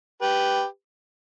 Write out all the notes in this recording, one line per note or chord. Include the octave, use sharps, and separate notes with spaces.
G4 B4